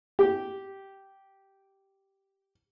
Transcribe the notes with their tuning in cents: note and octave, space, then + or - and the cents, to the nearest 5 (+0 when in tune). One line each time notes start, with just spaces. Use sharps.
G4 -10